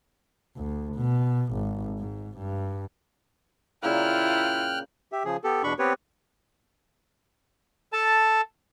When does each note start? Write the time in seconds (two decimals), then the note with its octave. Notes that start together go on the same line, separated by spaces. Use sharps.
0.56 D2
0.95 B2
1.53 G#1
1.98 G#2
2.38 G2
3.83 A#2 C#3 A#3 E4 F4 G5 F6 F#6
5.12 G4 E5
5.25 C#3 F3 G#4
5.44 B3 G4 A4
5.63 E2 B2 D4 B5 C#6
5.79 B3 C4 G4 B4 C#5
7.93 A4 A5